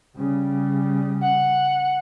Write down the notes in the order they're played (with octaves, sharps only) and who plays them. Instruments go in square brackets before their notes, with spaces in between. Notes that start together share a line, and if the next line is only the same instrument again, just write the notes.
[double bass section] C#3 G3
[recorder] F#5